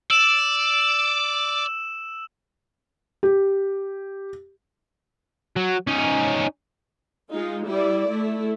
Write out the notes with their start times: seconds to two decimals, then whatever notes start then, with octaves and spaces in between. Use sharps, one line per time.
0.11 D5 E6 E7 F#7
3.23 G4
5.56 F#3
5.87 C#4 D#4
7.34 G#3 D#4 F4
7.69 G3 E4 D5
8.10 A3 E4